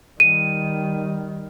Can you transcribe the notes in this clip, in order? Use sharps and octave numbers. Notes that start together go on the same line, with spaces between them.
D#3 G3 D#7